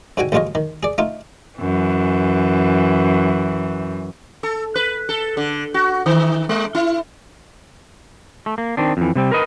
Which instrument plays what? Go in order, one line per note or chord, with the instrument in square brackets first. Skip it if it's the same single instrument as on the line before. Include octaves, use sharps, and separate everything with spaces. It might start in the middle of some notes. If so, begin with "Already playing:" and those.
[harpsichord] G#2 D3 F#4 G5 G#5
A1 D2 G#3 F4 C#5 D#5
D#3
G#4 D5
A3 D#4 F4
[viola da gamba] F#2 E3
[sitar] A4
B4
A4
D3
F#4
D#3
G#3
E4
[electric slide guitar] A3
A#3
D#3 C4 D4
F2 E3
C3 G3 C4
A#4 B4 D#5